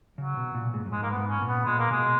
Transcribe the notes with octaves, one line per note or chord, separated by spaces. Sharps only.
C#3 F#3
B2
A#2
G#2
F#2
G#2 G#3
A#3
B3
G#2
C#4
A#2
B3
A#2 G#3
A#3
B2 G#3